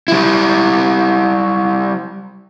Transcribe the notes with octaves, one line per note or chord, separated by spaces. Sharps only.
G3 E4